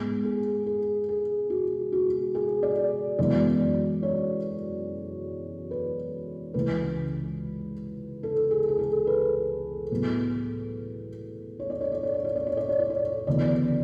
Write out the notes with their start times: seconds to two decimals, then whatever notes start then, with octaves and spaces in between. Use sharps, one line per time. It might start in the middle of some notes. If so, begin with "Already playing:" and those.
Already playing: G#2 G#3 B3 G#4
0.25 G#4
0.66 G#4
1.09 G#4
1.50 F#4
1.92 F#4
2.35 G#4
2.63 D5
3.19 F#2 E3 G#3 B3 D5
4.03 C#5
5.71 B4
6.54 C#2 C#3 E3 B4
8.23 A4
8.51 G#4
8.68 G#4
8.79 A4
9.07 B4
9.91 A2 F#3 B3
11.60 C#5
11.70 D5
11.81 C#5
11.92 D5
12.03 C#5
12.14 D5
12.24 C#5
12.36 D5
12.47 C#5
12.57 D5
12.69 C#5
12.79 D5
12.90 C#5
13.27 D2 C#3 E3 B3 D5